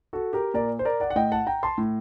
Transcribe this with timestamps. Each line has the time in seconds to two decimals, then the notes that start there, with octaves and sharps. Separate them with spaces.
0.13 F#4 A4
0.33 G4 A#4
0.54 A#2 A#4 D5
0.79 C5
0.85 A#4 D5
1.00 D5 F#5
1.10 F#5
1.16 A2 D#5 G5
1.32 F#5 A5
1.47 G5 A#5
1.63 A5 C6
1.78 A2